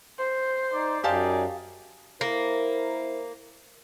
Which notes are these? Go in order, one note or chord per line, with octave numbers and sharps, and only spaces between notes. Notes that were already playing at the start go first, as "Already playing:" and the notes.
C5
D#4 D5
F#2 D#4 G4 G#4 D5 F5 A5
A#3 E4 A#4 C5